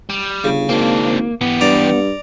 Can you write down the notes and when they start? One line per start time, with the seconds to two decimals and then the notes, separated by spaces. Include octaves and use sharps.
0.09 G3
0.44 G1 C#3
0.69 G#1 A#3 C4 D4
1.41 E3 B3 G4
1.61 G2 D5 A#5